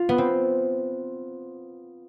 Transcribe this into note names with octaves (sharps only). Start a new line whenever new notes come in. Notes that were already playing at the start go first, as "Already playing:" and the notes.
Already playing: F4
B3
C4